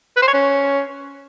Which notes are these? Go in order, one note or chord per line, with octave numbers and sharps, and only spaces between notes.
B4
C5
C#5
C#4